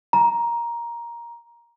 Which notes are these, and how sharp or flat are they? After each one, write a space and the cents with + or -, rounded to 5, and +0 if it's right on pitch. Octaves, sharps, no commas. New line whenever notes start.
A#5 +10